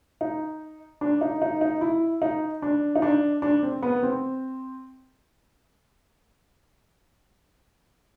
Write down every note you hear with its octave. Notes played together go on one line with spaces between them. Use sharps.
D#4
D4
D#4
D#4
D#4
E4
D#4
D4
D#4
D4
D4
C4
B3
C4